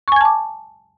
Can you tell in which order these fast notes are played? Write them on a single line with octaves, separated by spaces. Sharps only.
C#6 G#5 G#6 A5 D6